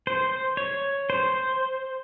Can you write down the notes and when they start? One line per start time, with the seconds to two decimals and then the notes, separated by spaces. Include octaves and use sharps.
0.07 C5
0.57 C#5
1.10 C5